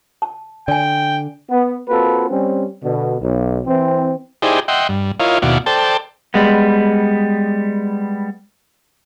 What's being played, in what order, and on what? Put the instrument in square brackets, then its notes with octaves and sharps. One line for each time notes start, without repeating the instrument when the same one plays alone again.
[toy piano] A5
[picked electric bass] D3 [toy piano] D5 G#5 [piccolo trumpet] G5
[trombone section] B3
A#3 C4 F4 F#4 A4 B4
G3 C4 C#4
B2 D3
B1
E3 C4
[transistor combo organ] D#4 E4 G4 G#4 C5 D5
D#5 E5 F#5 G5 C6
G2
E4 F4 A#4 C#5 D#5 F5
D#2 B2 E4 F#4 D5 F5
A4 C5 D5 G5 A5
[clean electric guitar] G3 G#3 B3